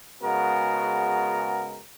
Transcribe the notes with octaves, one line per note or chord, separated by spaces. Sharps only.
C#3 G#3 B3 F#4 A#4